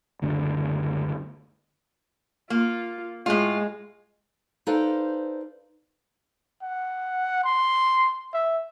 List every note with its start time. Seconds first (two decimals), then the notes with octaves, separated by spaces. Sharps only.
0.22 F#1 D2 D3
2.50 A#3 F4
3.26 A2 G#3 F4
4.67 D#4 A4 B4 C5 D5 F5
6.63 F#5
7.44 C6
8.34 E5